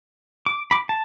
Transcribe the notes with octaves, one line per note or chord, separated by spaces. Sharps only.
D6
B5 D6
A5